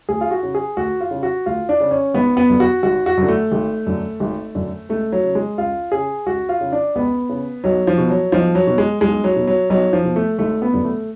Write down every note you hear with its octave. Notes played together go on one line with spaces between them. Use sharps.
D2 G#4
F4
F#4
C#3
G#4
D2 F#4
F4
C#3
F#4
D2 F4
D4
C#3
C#4
G#1 B3
B3
F#2 D3
F#4
G#1 F#4
F#4
F#2
D3
A3
G#1
F#2 D3
G#1
F#2 D3
C#2 A3
F#3
C#3
G#3
C#2 F4
C#3 G#4
C#2 F#4
F4
C#3
D4
C#2 B3
C#3
B1 F#3
F3
B2
F#3
B1 F3
F#3
B2
G#3
B1 G#3
F#3
B2
F#3
B1 F#3
F3
B2
A3
G#1 A3
B3
F#2 D3
A3